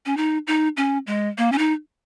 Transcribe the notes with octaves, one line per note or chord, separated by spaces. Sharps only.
C#4
D#4
D#4
C#4
G#3
A#3
C#4
D#4